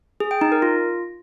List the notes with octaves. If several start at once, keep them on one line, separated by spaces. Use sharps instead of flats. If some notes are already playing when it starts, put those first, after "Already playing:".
G#4
G5
D#4
A#4
F4